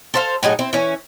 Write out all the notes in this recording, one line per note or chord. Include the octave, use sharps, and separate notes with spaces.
A4 C5 F5
A2 F#3 D#4 G#4
C4 E4
E3 C#4